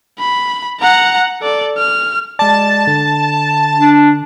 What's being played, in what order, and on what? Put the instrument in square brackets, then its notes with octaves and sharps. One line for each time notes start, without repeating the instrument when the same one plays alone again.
[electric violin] B5
F#5 A#5
A4 D5
F6
[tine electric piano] G#3 D5 [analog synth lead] A5
[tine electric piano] D3
[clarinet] D4